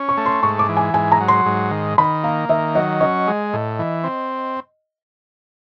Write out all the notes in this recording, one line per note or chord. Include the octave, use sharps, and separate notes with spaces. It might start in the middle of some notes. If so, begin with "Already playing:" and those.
Already playing: C#4
C#6
A3
C6
G#2 C#6
D6
E3
G#5
G#2 G#5
A#5
F#3
C6
G#2
D#3
D#3 B5
A#3 F5
D#3 E5
F#3 D#5
C#4 D#5
G#3
A2
E3
C4